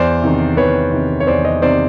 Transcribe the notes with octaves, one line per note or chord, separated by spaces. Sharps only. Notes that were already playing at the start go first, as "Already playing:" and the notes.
Already playing: E2 C5 D5
C3 D#3
E2 B4 C#5
C3 D#3
C#5
E2 C5 D5
C#5 D#5
C3 D#3 C5 D5